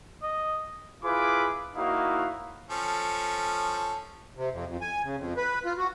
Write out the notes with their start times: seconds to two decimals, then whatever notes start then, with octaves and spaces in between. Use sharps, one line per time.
0.23 D#5
1.04 E4 F4 G#4 B4 B5 D6
1.76 A#3 D#4 E4 F#4 C#5 F5
2.71 F3 C#4 A4
4.37 C3
4.53 F2
4.67 F2
4.81 G#5
5.05 C#3
5.18 F2
5.37 B4
5.65 F4
5.77 F#4